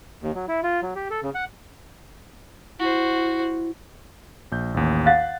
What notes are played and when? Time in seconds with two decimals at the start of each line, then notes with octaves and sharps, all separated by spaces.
0.22 D#2
0.35 F#3
0.48 E4
0.63 F4
0.82 F#3
0.95 G4
1.10 A4
1.23 C#3
1.35 F#5
2.79 E4 F#4 C5
4.52 A#1 G6
4.74 A1 D#2
5.06 F5 F#5 F#6 A6